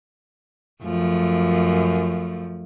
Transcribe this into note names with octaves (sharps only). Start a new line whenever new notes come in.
F#2 F3 A3